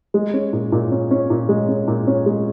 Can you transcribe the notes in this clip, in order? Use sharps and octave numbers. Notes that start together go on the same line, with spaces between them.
G#3
C#4
A#2
A#2
C#4
C#4
A#2
G#3
C#4
A#2
C#4
G#3